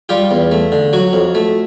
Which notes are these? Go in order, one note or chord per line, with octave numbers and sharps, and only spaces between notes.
G3 F4 G4
E2
A3
D3
F#3 F#4
F2
A3